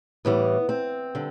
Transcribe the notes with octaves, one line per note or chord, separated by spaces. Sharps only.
A2 E3 G3 B3
C4
D3 G3